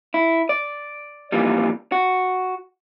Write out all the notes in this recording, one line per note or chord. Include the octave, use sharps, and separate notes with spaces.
E4
D5
F2 A#2 E3 G3
F#4